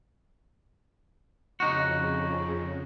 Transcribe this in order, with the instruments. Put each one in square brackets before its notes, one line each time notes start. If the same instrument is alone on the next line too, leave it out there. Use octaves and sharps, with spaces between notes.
[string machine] F2 C#3 [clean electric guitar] D#4 F#4